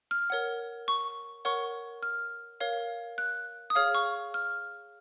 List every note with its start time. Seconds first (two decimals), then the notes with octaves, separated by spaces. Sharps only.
0.11 F6
0.30 A#4 C#5 F#5
0.88 C#6
1.45 A#4 C#5 F#5 C#6
2.03 F6
2.60 A#4 C#5 F5
3.18 F#6
3.70 D#6
3.75 G#4 C#5 F5 F6
3.95 C#6
4.34 F6